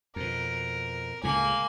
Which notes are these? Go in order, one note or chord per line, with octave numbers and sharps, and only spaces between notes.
F2 B2 A#4
C#2 A2 C#3 A#3 G#5